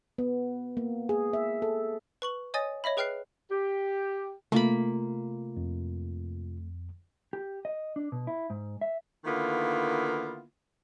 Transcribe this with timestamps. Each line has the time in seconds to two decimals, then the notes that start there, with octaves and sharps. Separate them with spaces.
0.18 B3
0.77 A#3
1.09 G#4
1.33 E5
1.62 A4
2.22 B4 C#6 F#7
2.54 C#5 D#5 G#5 D#6 A6
2.84 C#5 D#5 E5 B5
2.97 G#4 B4 G5 F6 F#6 C7
3.51 G4
4.52 C3 A3 A#3 F4 B5
5.57 F2
7.33 G4
7.65 D#5
7.96 D4
8.12 B2
8.27 E4
8.50 G#2
8.81 E5
9.25 D3 D#3 A#3 B3 E4 F4